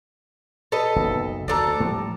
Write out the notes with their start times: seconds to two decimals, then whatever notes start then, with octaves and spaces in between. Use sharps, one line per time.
0.72 A4 B4 D#5
0.96 F#1 B1
1.48 D2 D4 A4 A#5
1.80 A2 F3 G3